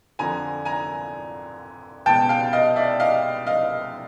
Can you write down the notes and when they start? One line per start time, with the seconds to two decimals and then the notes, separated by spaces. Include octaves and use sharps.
0.19 F2 D3 F3 G#5 A#5
0.65 G#5 A#5
2.06 C#2 B2 G5 A5
2.29 F5 G5
2.53 D#5 F5
2.76 D5 E5
3.00 D#5 F5
3.47 D#5 F5